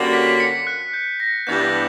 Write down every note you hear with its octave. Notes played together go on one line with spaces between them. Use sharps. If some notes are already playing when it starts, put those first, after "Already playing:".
Already playing: D3 G3 A#3 C#4 F#4
B6
C#7
F#6
G6
A#6
G2 E3 G3 B3 D4 G6